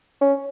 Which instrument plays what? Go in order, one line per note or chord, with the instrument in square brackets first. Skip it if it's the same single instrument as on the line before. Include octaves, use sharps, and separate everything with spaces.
[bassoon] C#4